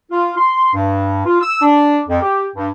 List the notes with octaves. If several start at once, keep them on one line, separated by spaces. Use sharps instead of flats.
F4
C6
G2
F4
E6
D4
F2
G4
G2